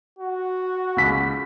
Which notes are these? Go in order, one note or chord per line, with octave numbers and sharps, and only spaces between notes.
F#4
C#2 B6